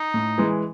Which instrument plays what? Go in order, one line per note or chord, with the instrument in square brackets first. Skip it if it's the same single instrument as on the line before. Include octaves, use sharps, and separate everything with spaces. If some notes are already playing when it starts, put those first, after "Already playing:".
Already playing: [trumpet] D#4
[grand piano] A2
E3 G#3